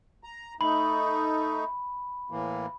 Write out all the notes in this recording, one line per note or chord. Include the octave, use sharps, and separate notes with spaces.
A#5
A3 D#4 B5
A2 E3 A#3